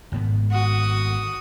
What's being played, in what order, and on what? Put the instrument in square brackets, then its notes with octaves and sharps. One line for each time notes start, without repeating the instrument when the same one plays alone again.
[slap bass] G#1 G#2 B3
[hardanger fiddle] F#4 D#6